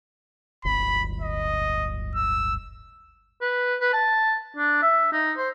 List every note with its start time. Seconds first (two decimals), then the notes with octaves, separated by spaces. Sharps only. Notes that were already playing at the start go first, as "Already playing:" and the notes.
0.65 D1 G1 B5
1.21 D#5
2.15 E6
3.41 B4
3.81 B4
3.93 A5
4.57 D4
4.82 E5
5.13 D#4
5.37 C5